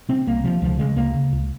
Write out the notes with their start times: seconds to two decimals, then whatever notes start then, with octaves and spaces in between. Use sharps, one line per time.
0.09 C3 C4
0.27 C2 A#3
0.44 C3 F3
0.62 C#2 F3
0.79 C#3 G#3
0.96 C#2 A#3
1.14 C#3
1.33 C#2